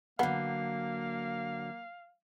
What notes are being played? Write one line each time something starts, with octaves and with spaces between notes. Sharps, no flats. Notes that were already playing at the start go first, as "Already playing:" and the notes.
D3 F#3 A#3 B3 F5